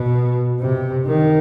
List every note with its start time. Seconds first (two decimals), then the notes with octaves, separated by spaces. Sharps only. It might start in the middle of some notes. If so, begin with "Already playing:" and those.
Already playing: B2
0.60 C3
1.07 D#3